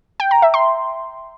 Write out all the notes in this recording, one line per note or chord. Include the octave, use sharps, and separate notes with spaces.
G5
A#5
E5
C6